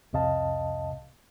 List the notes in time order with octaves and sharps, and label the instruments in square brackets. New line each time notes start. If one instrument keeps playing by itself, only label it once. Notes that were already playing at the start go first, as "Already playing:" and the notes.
[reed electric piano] C2 F2 C3 D#5 F5 A5